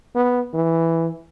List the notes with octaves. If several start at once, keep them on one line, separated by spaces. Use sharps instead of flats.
B3
E3